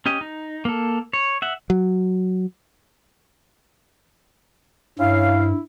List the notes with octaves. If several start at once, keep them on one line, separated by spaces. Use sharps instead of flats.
C#4 G4 D#5
D#4
A#3 A4
C#5
E5 F#5
F#3
G2 C#4 E4 C#5 F5